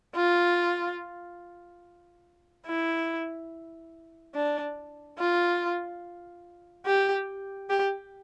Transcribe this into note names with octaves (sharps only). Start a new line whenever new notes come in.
F4
E4
D4
F4
G4
G4